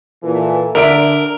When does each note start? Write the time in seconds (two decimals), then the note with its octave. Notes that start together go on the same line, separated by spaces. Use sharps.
0.23 A#2 E3 A4
0.75 D3 D4 A#4 E5 D7